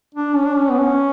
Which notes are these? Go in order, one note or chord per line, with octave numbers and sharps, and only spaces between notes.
D4
C#4
D4
C#4
B3
C#4